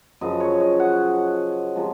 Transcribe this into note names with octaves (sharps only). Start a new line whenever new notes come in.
F#2 C#3 F3 D#5
C#5
D#5
F#5
C3 F3 G#3